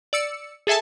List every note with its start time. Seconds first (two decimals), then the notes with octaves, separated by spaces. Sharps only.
0.13 D5 E6 C#7
0.67 G#4 A4 E5 G#5 A5